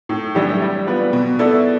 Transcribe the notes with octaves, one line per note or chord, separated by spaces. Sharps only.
A2
E3 G3 D4 G4
G3
B3 F4 B4 D5
B2
B3 E4 A4 D5